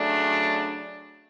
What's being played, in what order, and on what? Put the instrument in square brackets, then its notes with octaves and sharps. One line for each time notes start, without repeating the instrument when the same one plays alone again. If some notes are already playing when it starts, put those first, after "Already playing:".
Already playing: [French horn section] C#3 F#3 A3 D4